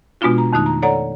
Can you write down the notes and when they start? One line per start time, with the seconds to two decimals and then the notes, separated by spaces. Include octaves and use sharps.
0.21 B2 G#3 B3 D4 F4 F#4
0.38 A#5
0.53 F2 D#3 A3 D#4 F#6
0.66 A#5
0.82 A4 C#5 D5 F#5 A#5